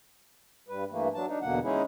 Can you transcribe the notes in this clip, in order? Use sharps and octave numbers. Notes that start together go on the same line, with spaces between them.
G2 G3 B4
G2 E3 A3 A#3
F#3 D4 A5
D4 D#4
E2 B2 D3 A#3 F#5
G#3 C#4 D#4 E4 G#4